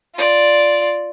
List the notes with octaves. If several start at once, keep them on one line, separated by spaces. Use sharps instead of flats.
F4 D5